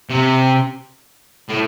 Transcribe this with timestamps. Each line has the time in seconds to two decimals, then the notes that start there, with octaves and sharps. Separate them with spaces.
0.10 C3
1.49 A2